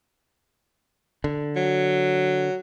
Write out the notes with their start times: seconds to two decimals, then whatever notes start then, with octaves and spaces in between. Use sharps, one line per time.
1.24 D3
1.56 F#3